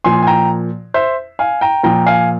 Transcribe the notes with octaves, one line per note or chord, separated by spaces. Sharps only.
A#2 F3 G#5 C6
G#5
G5 A#5
C5 E5
F5 G#5
G5 A#5
A#2 F3 G5 A#5
F5 G#5